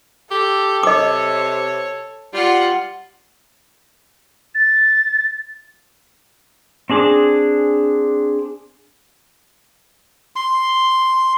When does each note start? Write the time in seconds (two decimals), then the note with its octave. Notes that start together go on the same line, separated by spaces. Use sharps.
0.31 G4 A4
0.83 C3 C#5 D#5 D6
2.34 G3 F4 F#5
4.55 A6
6.90 C4 D4 G#4 D6
10.36 C6